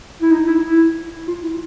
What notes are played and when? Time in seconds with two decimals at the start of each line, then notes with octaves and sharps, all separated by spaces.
0.21 E4
0.31 D#4
0.47 E4
0.63 E4
1.27 F4
1.43 E4